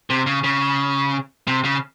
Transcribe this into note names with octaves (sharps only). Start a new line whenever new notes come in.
C3
C#3
C#3
C3
C#3